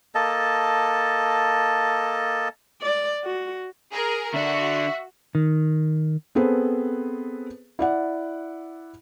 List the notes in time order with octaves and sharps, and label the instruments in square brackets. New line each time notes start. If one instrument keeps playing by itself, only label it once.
[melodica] A#3 A4 D#5 A5
[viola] D5
F#4
[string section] G#4 A#4
[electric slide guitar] D3 D4 [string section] F#4 [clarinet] E5
[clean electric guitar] D#3
[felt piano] B3 C4 G#4 A4 B4 C5
E4 D5 F#5